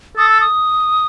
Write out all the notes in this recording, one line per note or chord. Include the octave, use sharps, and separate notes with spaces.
A4 D#6
E6
D#6